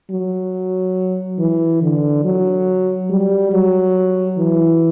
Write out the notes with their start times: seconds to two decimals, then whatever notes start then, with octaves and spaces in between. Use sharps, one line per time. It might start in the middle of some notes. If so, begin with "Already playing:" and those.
0.11 F#3
1.39 E3
1.82 D3
2.24 F#3
3.10 G3
3.52 F#3
4.38 E3